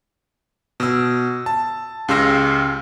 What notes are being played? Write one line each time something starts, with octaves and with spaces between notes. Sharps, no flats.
B2 E6
A5
C#2 C#3 G4 C6 E6 A#6